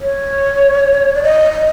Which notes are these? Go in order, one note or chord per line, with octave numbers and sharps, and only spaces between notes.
C#5
D5
D#5
D#5